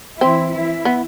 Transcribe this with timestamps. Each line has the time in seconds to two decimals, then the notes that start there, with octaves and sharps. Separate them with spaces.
0.21 E3 C4 E4
0.53 E3 E4
0.85 B3